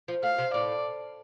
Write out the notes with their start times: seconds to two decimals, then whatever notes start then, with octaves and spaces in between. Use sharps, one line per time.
0.08 F3
0.23 A3 F5
0.38 C3
0.54 A2 D5